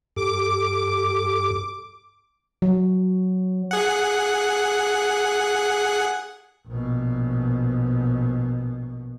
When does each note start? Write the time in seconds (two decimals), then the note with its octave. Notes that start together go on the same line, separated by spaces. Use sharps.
0.16 G2 G4 A4 D6
2.62 F#3
3.71 G#4 F#5
6.68 A#1 B2